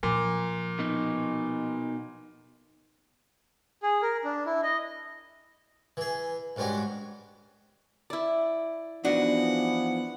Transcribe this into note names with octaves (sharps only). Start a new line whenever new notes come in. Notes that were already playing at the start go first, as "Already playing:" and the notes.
A#2 F3
B2 D#4
G#4
A#4
D4
E4
D#5
E3 G#4
A#1 G#2 G3 C#4 F#4
E4 D5
E3 F3 B3 D4 D#4 F#4 F#5